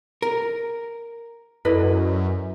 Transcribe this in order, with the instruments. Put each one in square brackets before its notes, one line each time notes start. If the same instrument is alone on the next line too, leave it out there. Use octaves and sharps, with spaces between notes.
[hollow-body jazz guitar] A#4
[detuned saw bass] F#2 [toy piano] E4 A4 D5 [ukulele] B4 D#5